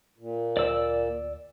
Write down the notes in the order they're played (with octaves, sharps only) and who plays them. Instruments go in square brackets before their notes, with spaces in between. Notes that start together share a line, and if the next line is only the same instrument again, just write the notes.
[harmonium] A#2
[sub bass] D2 [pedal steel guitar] D5 E6